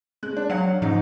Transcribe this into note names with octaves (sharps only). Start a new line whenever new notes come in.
G#3 F#6
D4
F#3 F5 F#5
G#2 C#3 F3 D#4